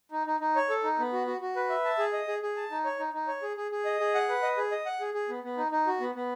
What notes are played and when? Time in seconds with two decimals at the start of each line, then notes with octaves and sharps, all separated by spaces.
0.12 D#4
0.27 D#4
0.40 D#4
0.56 C#5
0.70 A4
0.84 D#4
0.99 B3
1.13 F#4
1.27 F#4
1.41 F#4
1.56 B4
1.69 E5
1.85 A5
1.99 G#4
2.13 D#5
2.28 G#4
2.42 G#4
2.57 A5
2.71 D#4
2.85 C#5
2.99 D#4
3.14 D#4
3.28 C#5
3.42 G#4
3.57 G#4
3.71 G#4
3.85 D#5
4.00 G#4
4.15 F#5
4.29 B4
4.43 D#5
4.57 G#4
4.71 D#5
4.86 F#5
5.00 G#4
5.14 G#4
5.29 B3
5.44 B3
5.57 D#4
5.72 D#4
5.87 F#4
6.00 B3
6.15 B3